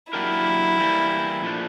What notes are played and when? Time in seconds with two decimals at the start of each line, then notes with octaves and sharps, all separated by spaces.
0.13 F#3 A#3 D4 E4 G4 A#4
0.78 E3 G3 A#3
1.42 A#2 F3 A3 D4